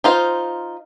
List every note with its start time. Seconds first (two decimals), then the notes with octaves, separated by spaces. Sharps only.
0.04 D#4 F4 C5